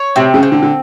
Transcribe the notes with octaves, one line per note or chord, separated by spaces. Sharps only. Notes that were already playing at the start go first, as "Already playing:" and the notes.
Already playing: C#5
C3 C4
C#3
C4
D3
D3